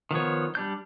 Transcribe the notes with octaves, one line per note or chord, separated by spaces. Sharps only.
D#3 F3 B3 C#5
G3 D4 G6